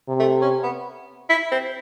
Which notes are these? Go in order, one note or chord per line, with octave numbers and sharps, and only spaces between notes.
C3
A3
C#4
B3
E4
C4